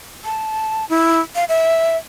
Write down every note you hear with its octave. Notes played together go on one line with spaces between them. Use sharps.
A5
E4
F5
E5